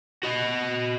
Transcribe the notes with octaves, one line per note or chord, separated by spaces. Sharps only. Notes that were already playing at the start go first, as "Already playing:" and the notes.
F#4 D#5